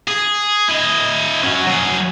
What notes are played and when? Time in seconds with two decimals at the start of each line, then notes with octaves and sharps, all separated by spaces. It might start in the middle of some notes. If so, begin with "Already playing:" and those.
0.07 G#4
0.68 E4 D#5
1.43 C#4 F#4
1.67 F#3 G#4